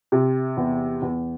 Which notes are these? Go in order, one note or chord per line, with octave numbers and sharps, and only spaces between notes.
C3
E2
E2